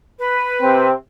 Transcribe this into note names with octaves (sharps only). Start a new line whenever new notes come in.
B4
C3 C4